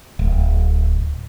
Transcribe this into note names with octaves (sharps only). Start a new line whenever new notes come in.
D1